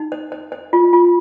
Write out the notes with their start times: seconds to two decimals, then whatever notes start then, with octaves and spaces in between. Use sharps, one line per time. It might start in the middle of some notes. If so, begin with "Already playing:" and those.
Already playing: D#4
0.12 C5
0.32 C5
0.52 C5
0.73 F4
0.93 F4